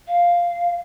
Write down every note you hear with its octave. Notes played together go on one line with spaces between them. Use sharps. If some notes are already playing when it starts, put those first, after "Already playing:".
F5